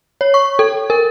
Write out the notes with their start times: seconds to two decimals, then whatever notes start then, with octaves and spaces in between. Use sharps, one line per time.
0.21 C#5
0.34 C#6
0.59 A4
0.90 A#4